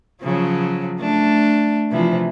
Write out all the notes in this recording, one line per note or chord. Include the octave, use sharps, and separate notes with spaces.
C#3 F3 F#3
A3 D4
C3 E3 F3